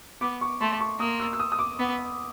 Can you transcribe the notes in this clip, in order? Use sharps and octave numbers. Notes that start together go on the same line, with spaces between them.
B3 D6
C#6
A3 C6
C#6
A#3 D#6
E6
E6
D#6
D#6
D6
B3